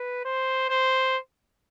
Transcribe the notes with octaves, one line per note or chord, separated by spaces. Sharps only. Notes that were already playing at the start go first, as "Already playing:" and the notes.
Already playing: B4
C5
C5